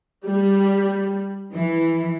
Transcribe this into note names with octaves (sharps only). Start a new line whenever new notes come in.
G3
E3